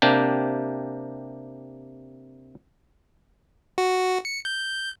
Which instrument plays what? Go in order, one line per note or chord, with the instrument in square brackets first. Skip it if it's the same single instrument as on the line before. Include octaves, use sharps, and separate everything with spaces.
[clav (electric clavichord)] C3 A#3 D4 G4
[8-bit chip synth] F#4
C#7
G6